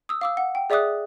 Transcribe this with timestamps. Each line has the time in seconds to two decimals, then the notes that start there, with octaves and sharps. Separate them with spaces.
0.09 D#6 E6
0.21 F5 D6 E6
0.37 F#5
0.55 G5
0.70 G#4 D5 E5 D6 D#6 F#6